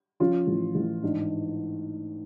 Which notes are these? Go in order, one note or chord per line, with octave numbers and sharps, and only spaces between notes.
F3 C#4 F4
A1
A1
G#2 D4